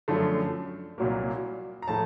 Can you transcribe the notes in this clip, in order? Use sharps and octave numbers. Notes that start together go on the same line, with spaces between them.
F#2 D3 F3 A3
C2 A#2 F#3 A#3
A#5
A2 F3 A3 A5